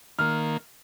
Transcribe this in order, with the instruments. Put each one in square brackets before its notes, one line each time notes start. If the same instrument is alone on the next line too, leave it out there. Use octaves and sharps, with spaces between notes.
[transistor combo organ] D#3 A#3 [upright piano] F6